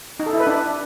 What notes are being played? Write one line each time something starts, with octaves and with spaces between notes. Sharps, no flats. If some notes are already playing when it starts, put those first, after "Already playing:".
D#4
A4
E4
B4
D4